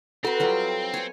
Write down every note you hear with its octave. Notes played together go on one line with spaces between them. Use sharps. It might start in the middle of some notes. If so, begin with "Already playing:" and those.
C4 F#4 A4 B4
F#3 G3 F4
C#5 G#5